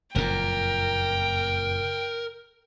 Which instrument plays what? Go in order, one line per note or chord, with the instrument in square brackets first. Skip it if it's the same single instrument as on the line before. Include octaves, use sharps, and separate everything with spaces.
[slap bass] F#1 F2 A#2 [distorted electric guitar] A#4 [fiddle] G5